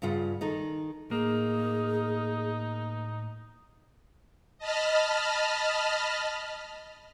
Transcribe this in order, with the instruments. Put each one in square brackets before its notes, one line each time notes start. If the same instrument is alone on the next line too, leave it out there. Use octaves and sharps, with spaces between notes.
[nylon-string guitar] G2 C#3 F4 F#5
D#3 D#4 A4
[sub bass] A2 [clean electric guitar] A#3 [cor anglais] D#4 [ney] G#4
[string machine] D#5 A5 B5 F6